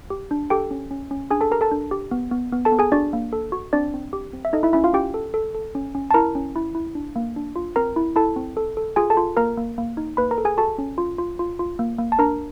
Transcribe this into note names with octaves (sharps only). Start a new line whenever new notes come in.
G4
D4
G4 A4 G5
C#4
C#4
C#4
D4 G#4 G#5
A4 A5
G4 A#4 A#5
A4 A5
D4
G4
B3
B3
B3
A4 A5
B3
G#4 G#5
D4 F#4 D5
A#3
A4
F#4
C4 D4 D5
C4
G4
C4
E5
D#4 A4 D#5
E4 E5
C#4 E4 E5
F4 F5
C#4 G4 G5
A4
A4
A4
C#4
C#4
A5
E4 A#4 A#5
C#4
E4
E4
D4
A#3
D4
F4
C4 A#4 A#5
E4
E4 A4 A5
C4
A4
A4
F4 G#4 G#5
A4 A5
F4
A#3 A#4 A#5
A#3
A#3
D#4
A#3 B4 B5
A#4 A#5
A4
G#4 G#5
F#4 A4 A5
C#4
F4
F4
F4
F4
A#3
A#3
A5
D4 A#4 A#5